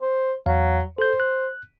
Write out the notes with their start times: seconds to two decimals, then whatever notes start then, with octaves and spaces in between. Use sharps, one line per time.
0.02 C5
0.46 E2 F#3 F5
0.98 A4 C5 G6
1.20 F#6